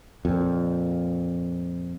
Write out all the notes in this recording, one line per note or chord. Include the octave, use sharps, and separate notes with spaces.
F2 A#2